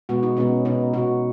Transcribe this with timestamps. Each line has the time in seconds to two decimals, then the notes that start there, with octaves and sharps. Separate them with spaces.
0.09 B2 G#3 B3 F#4
0.23 D#4
0.37 B2 G#3 B3 C#4
0.65 B2 B3 D#4
0.93 B2 B3 F#4